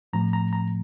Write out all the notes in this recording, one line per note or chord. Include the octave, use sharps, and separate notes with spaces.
A2 F3 A3 C4 A#5
A#5
A#5